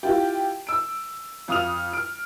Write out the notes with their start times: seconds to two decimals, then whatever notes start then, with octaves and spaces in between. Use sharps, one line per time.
0.03 E4 F4 G4
0.67 E6 D7
1.48 F2 F5 D#6 F6 F7
1.93 F6 D7